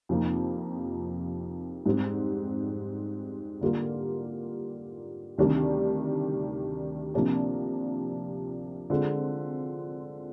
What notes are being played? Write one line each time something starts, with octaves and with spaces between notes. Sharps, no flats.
F2 C3 F3 A#3 D#4
G#2 G3 C4
D3 G3 A#3 F4 A#4
D2 C3 D#3 G3 D4
C3 F3 A#3 D4 G4
D3 G#3 C4 F4